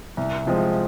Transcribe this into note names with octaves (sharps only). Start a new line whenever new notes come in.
C2
C3 F3 G#3 C4